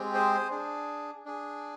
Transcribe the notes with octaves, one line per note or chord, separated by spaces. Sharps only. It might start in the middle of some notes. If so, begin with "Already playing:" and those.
Already playing: G#3 C4 G4
G#4 C5
D4 G#4
D4 G#4